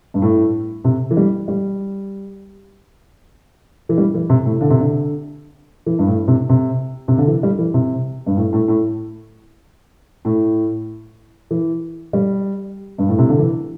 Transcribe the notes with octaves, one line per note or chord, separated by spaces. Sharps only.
G2
A2
C3
E3
G3
G3
E3
G3
E3
C3
A2
D3
C3
D3
E3
G2
A2
C3
C3
C3
D3
E3
G3
E3
C3
G2
A2
A2
A2
A2
E3
G3
G2
A2
C3
D3
E3